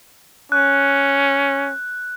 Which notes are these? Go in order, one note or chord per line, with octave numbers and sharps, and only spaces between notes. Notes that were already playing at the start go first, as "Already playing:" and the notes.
C#4 F#6